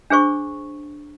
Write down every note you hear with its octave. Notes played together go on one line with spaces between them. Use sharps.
D4 G#4 C5 C#6